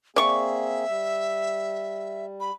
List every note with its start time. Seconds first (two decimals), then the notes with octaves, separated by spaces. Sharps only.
0.16 A#3 C4 G#4 D5 E5 C#6
0.88 G3
2.40 B5